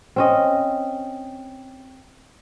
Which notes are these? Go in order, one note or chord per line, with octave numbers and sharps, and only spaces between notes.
C4 C#4 D#5